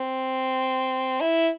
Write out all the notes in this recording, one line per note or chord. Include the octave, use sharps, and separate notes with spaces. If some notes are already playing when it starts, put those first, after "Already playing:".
Already playing: C4
E4